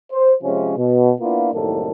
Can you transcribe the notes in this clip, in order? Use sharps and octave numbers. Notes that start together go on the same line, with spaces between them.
C5
C3 F3 G#3 C#4
B2
A#3 B3 D4 E4 F4
C2 F#2 A2 D#3 A#3 A4